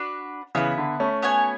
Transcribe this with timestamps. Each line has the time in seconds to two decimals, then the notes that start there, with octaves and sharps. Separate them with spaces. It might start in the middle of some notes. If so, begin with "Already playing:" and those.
Already playing: D4 F#4 B4
0.55 C#3 E3 B3 E4 B4
0.78 D3
1.00 A3 C#4
1.22 B3 F#4 C#5 G#5